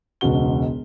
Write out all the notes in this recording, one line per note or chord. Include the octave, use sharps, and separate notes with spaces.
E1 C#2 B2 F#4 G7